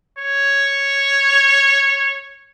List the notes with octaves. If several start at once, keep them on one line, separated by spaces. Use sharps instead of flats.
C#5